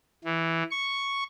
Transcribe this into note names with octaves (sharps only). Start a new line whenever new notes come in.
E3
C#6